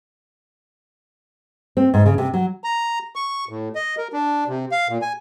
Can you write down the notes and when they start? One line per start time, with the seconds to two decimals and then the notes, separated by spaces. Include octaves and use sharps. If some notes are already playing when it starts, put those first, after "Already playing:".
1.77 C4
1.94 G#2
2.06 C#3
2.18 C3
2.34 F#3
2.64 A#5
3.16 C#6
3.49 A2
3.75 D#5
3.98 A#4
4.13 D4
4.48 C3
4.71 F5
4.89 A#2
5.02 G#5